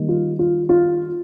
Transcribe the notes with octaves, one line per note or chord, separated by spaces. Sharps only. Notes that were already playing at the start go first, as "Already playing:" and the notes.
Already playing: D#3 G3 A#3 D#4
F4
F4
F4